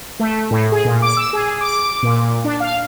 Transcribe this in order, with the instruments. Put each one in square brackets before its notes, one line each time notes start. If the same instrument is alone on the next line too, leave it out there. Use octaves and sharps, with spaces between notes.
[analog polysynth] A3
A2
G#4
A#2
D6
E6
G#4
D6
A#2
D4
F5